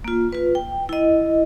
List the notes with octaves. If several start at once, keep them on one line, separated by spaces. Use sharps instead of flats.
A#3 F4
F4 B4
G5
E4 D#5